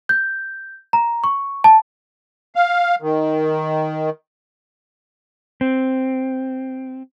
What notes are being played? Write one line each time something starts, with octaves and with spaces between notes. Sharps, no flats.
G6
A#5
C#6
A5
F5
D#3
C4